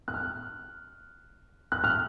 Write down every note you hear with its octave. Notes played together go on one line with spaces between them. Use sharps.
F#6
F6
F#6
F6